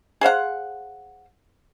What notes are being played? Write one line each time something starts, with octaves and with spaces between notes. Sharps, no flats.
G#4 C5 F5 F#5